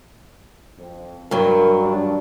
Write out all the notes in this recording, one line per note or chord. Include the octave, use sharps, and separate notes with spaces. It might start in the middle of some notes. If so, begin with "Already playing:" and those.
F2
G2 F#3 A#4
D#3 G3 D4